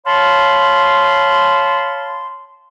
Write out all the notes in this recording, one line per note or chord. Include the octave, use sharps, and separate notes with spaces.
C#5 F5 A5 B5 C6